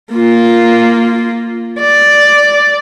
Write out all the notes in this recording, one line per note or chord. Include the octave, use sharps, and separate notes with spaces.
A#3 F4
D5